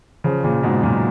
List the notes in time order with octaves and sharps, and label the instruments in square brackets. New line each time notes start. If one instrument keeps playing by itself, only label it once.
[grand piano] C#3 F3
A#2 C#3
G#2 B2
F#2 A#2